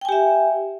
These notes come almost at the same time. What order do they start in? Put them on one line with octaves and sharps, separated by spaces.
G5 G#5 G4 E5